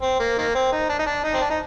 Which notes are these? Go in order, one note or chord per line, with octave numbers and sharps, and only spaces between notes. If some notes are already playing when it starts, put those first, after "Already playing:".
C4
A#3
D#3 A#3
C4
D#4
D4
D#4
D4
D#4
C4
D4
D#4